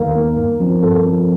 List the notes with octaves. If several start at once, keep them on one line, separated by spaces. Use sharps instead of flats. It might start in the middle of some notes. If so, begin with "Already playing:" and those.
Already playing: D#2 D#3 A#3 A#4 F5
D#3 A#3
G2
F3 C4
G2 A4
F3 C4